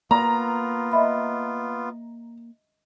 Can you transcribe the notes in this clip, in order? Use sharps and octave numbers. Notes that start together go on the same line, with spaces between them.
A#3 B3 F4 A#5
D#5 E5 B5